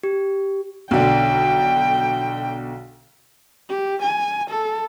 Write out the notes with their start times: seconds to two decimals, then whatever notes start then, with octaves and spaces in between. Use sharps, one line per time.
0.03 G4
0.91 B1 D3 G5
3.69 G4
4.02 G#5
4.50 A4